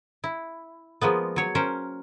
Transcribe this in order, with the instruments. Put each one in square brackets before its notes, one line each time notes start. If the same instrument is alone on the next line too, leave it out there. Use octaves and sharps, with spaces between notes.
[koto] E4
F3 G#3 A#3 B3
F#3 C#5
C#4 A#4 C5